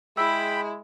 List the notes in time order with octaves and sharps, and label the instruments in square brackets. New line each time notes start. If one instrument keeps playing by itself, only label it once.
[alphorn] G#3 [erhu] E4 [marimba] G#4 E6 [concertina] G5 B5